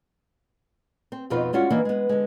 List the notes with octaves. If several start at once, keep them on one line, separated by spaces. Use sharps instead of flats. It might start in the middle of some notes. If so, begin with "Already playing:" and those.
C4
F2 B2 C4 D#4 F4 B4
G3 G#3 C#4 F4 F#4
E3 A#3 B3 D4 D#4
G#3 B3
D3 G#3